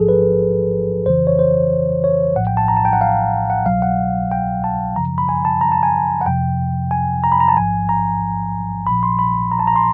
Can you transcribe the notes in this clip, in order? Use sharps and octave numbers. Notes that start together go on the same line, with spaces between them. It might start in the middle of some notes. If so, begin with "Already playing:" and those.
Already playing: A1 G#2 F3 G#4 A4
B4
F2 C#3 E3 C5
C#5
C5
C#5
A#1 A2 F3 F#5
G5
A5
A#5
A5
G5
F#5
F5
F#5
C2 B2 F#3 F5
F#5
G5
A5
F#2 C#3 F3 A#5
B5
G#5
A5
A#5
A5
G#5
F#5
F2 C3 F3 G5
G#5
A#5
B5
A#5
A5
A1 G#2 F3 G#5
A#5
A#1 A#2 F3 B5
C6
B5
A#5
A5
A#5
C6